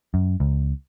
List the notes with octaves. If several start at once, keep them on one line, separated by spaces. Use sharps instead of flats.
F#2
C#2